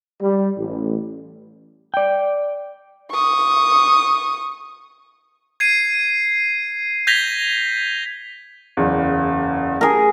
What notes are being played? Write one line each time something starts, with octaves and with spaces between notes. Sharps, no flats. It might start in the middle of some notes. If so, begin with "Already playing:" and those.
G3
A1
D5 G5
C#6 D#6
G#6 C7 D#7
G6 G#6 A#6 B6 F7 G7
F#1 E2
G#4 A#4